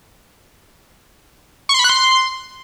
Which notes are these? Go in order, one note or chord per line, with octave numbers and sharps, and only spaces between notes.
C#6
C6
B5
F#6
C6